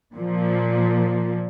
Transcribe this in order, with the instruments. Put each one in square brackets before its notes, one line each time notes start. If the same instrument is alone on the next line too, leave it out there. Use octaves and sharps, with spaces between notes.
[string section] A#2 F3